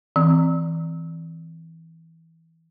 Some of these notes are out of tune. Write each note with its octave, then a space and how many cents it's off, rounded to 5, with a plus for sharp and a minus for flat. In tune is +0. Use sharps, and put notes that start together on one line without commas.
E3 -15 C4 +0